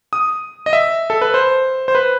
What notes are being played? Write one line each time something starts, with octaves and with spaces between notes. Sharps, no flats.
D#6
D#5
E5
A4
B4
C5
C5
B4